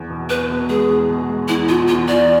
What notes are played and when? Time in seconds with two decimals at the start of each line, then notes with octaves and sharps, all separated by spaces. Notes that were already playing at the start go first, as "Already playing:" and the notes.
Already playing: E2
0.10 B2
0.30 E2 B4
0.50 B2
0.69 G#3 G#4
0.90 E2
1.09 B2
1.29 G#3
1.48 E2 E4
1.69 B2 F4
1.88 E2 F4
2.08 E2 D5